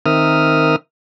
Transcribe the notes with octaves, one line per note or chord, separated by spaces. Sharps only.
D#3 C4 A#4 E5 D#6 F6